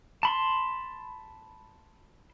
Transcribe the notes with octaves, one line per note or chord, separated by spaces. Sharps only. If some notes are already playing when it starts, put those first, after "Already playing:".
A5 B5 C6